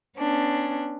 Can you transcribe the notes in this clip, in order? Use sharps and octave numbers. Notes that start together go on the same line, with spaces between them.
B3 C#4 D4